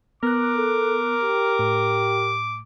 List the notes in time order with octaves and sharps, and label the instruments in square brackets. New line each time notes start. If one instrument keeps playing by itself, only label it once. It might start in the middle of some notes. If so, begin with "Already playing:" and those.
[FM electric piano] B3 F#6 [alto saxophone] A#4 [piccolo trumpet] D6
[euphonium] A4
G4
[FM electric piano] A2